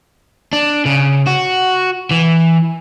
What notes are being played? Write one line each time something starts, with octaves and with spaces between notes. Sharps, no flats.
D4
C#3
F#4
E3